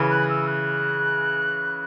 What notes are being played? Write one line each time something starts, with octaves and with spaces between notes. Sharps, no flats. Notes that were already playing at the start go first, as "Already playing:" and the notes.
Already playing: C#3 E3
F#6
E6
F#6